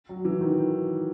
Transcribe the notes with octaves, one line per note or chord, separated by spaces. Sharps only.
F#3
E3
D#3